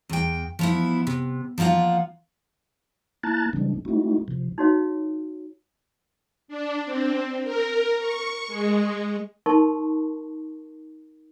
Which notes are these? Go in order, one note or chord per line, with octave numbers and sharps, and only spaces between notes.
E2 G5
F3 B3 E4
C3
F3 A#3 E4 F4 F#5
A#3 E4 A5 A#5 F#6 A6
C#3 E3 G3 G#3 C4 D4
G#3 A3 C4 D#4 E4 F#4
C3 F3
D#4 F#4 C#5 F5
D4
C4
A#4
C#6
G#3
D#4 A#4 A5 C6 C#6